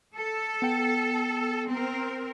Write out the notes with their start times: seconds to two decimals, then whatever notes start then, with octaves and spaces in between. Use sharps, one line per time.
0.15 A4
0.62 B3 G5
1.67 C4 A#4